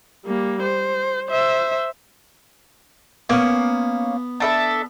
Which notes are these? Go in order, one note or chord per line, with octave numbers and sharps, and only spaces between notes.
G3 A#3
C5
C5 E5
A#3 B3 C#4
D4 A4 E5